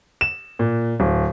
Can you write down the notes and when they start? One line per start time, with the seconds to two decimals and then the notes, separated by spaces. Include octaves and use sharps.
0.21 E7
0.59 A#2
1.00 D1